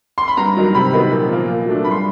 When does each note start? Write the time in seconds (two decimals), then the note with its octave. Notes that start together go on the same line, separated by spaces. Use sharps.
0.18 C6
0.28 B5
0.37 G2 A#5
0.57 D#3 F#3
0.75 C3 B5
0.93 D#3 F#3 B3 D#4
1.10 A#2
1.29 F3 A#3
1.48 A#2
1.66 F#3 A3 D4
1.84 G2 B5
1.91 C6